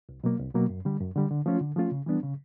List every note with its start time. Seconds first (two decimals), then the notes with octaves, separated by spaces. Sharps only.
0.09 C2
0.24 B2 F#3 A#3
0.39 C2
0.55 B2 F#3 A#3
0.69 F#2
0.85 D3 G3
1.00 F#2
1.16 D3 G3
1.31 D3
1.46 F3 A3 C#4 F4
1.61 D3
1.76 F3 A3 C#4 F4
1.91 C#3
2.06 E3 G3 B3 D4
2.23 C#3